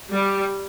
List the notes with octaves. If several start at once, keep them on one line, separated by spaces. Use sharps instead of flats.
G3